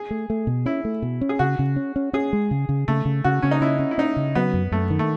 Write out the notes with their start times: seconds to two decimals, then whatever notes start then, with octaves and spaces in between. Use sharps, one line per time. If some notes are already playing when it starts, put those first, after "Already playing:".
Already playing: G#4
0.11 A3
0.30 A3
0.47 B2
0.66 C#4 E4
0.85 A3
1.02 B2
1.21 C#4
1.29 G#4
1.39 C#3 F#4
1.59 C#3
1.76 C#4
1.96 C#4
2.13 C#4 G#4
2.33 G#3
2.51 C#3
2.69 C#3
2.88 C#3 A3
3.05 C#3
3.24 C#3 F#4
3.42 C#3 C#4
3.51 D#4
3.61 C#4 E4
3.79 C#4
3.91 E4
3.98 C#4 D#4
4.16 C#3
4.35 F#3 B3
4.54 F#2
4.72 F#2 A3
4.90 D#3
4.99 A3